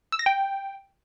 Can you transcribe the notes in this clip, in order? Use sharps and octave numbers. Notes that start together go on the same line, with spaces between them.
E6
A#6
G5